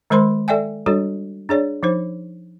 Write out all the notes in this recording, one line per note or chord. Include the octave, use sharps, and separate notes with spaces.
D#3 G#3 A#4 C5 B5 C6
A4 D5 E5 G5 G#5
G3 D4 F#4 A4 C#5
D4 G#4 C#5 D5
F3 D#4 C5